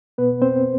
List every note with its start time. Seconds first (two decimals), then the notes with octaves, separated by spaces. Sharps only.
0.18 B2 B3 B4
0.42 C4 C5